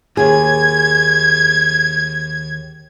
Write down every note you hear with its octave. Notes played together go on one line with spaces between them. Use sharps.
D#2 G#4 G#6